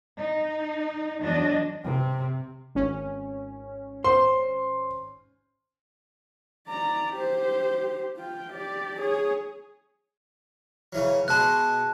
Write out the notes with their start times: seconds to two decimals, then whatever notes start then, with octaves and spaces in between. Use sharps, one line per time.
0.18 D#4
1.21 E2 F#3 D4 D#5
1.84 C3 C4
2.75 G#1 C#4
4.04 C5 C6
6.67 D5 A#5
7.13 G4 C5
8.16 F4 G5
8.53 G4 D5
8.99 G#4 C#5
10.93 C#3 E3 F#3
11.28 B2 G#3 B3 A5 F#6